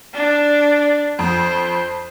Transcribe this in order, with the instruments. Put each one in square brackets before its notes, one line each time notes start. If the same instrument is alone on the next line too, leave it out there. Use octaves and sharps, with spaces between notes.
[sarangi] D4
[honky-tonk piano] F2 [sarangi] C5